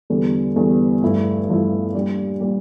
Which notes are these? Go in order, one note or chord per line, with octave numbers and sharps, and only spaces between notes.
E2 D3 G3
E2 D3 G3
G2 F3 A3 E4
G2 F3 A3 E4
A#2 G3 D4 G4
A#2 G3 D4 G4